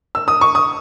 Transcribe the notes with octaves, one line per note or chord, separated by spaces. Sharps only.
E6
D#6
C#6
D#6